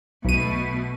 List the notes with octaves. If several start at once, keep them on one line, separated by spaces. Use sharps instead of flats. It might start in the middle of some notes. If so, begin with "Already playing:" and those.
B1 B2 A3 D#7